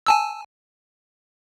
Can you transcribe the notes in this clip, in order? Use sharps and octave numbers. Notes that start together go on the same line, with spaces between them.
G#5 A5 E6